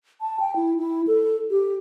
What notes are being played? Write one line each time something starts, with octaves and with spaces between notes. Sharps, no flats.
A5
G5
E4
E4
A4
G4